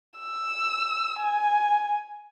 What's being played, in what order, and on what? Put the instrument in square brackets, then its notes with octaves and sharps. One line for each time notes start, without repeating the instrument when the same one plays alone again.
[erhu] E6
G#5